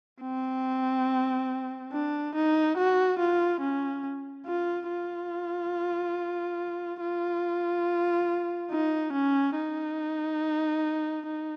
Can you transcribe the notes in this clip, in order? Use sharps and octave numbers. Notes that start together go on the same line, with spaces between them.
C4
D4
D#4
F#4
F4
C#4
F4
F4
F4
D#4
C#4
D#4
D#4